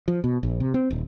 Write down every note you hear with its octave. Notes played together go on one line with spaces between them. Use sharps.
F3
B2
A#1
C3
C4
D#1